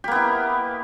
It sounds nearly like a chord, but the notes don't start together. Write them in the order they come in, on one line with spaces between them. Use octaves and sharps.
G4 A#3 B3 E4